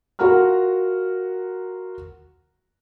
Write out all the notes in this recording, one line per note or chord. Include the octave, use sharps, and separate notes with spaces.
F4 F#4 A#4 F#5 A#5 F6